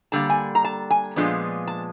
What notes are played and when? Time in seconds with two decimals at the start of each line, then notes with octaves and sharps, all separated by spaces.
0.12 D3 G3 A#3 A5
0.30 G#5
0.55 A#5
0.65 A5
0.90 G#5
1.16 A#2 F3 G#3 B3 D4
1.67 A5